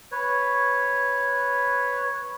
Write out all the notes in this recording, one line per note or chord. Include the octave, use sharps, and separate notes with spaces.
B4 C#5